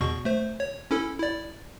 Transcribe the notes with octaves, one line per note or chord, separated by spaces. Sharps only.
E2 B2 C#6
A3 C5
C#5
C#4 E4 A4
E4 D5